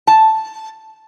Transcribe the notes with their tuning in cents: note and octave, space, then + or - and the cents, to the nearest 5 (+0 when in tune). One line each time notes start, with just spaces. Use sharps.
A5 +0